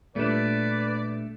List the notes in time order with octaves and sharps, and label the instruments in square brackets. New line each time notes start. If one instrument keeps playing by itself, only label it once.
[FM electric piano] A#2 G3 [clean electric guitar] A3 D4 [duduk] B4 [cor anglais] D5